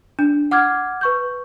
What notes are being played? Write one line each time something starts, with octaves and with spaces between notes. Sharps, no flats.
D4
F#5 D6 F6 G#6
B4 C#6 G6